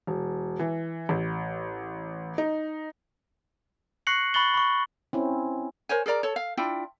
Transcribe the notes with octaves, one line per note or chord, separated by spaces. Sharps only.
E1
E3
A1
D#4
C#6 F#6 A#6 C7 C#7 F#7
B5 C#6 F#6 A6 F#7 G7
B5 C#6
C4 C#4 E4
A#4 C5 C#5 G#5
G#4 A#4 D5 A#5
A4 C#5
F5
D4 E4 F4 G5